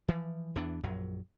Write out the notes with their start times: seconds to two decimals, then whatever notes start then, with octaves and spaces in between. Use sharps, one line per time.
0.08 E3 F3
0.55 E2 E3 B3 D4
0.83 A#1 F#2 F#3